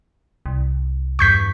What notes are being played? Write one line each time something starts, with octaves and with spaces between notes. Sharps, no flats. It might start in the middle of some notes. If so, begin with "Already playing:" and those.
C2
E2 G2 C#6 G6 B6